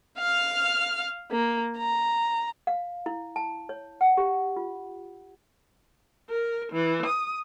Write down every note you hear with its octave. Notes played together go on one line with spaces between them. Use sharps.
F5 F6
A#3
A#5
F5
E4
A5
C#5
F#5
G4
F4
A#4
E3
D#6